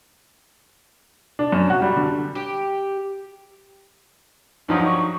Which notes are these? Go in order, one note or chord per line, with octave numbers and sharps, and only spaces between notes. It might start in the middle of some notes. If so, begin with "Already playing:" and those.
D4
F#2
F#4
G3
D3
G4
G2 F3 F#3 D#4
C#6